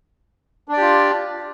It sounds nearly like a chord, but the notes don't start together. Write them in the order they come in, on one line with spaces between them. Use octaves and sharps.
D4 D5 G4 F4